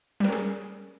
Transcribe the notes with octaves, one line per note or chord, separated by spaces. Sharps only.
G3 C#4 G#4 A#4